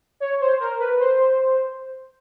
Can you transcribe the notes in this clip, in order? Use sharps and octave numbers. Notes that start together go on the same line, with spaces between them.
C#5
C5
A#4
B4
C5